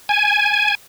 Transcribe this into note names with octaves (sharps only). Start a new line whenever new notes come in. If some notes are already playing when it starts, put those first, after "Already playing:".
G#5